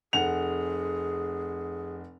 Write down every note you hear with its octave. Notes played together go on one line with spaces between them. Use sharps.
F1 G#4 F#5 F7